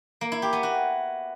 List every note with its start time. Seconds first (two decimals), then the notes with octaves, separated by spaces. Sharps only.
0.21 A#3
0.32 E4
0.42 G4
0.53 B3
0.63 F#4